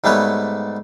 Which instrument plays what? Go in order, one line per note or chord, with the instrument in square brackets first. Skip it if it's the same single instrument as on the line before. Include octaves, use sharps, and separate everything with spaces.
[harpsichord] G#2 G3 A3 B3 B4 C#5